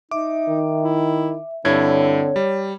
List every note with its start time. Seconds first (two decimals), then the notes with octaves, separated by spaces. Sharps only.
0.11 D#4 E5 D6
0.48 D#3
0.82 E4
1.65 G2 D3 C4 E4 C#5 G#6
2.36 G3